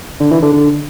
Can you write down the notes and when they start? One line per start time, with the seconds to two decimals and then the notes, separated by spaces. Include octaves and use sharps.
0.20 D3
0.31 E3
0.42 D3
0.53 D3